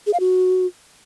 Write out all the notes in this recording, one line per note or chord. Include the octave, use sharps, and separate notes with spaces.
G#4
F5
F#4